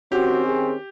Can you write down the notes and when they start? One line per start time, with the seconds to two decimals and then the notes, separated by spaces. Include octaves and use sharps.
0.12 D#3 C4 C#4 F#4 G4
0.46 G#4